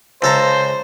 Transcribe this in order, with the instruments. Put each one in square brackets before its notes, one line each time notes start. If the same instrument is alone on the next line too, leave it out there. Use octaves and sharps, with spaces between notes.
[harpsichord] C#2 A4 A#5 [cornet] C5